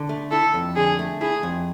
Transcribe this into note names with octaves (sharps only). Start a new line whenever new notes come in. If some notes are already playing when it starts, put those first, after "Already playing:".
Already playing: D3
A3
E4 A4
F2
D3 G#4
A3
E4 G#4
F2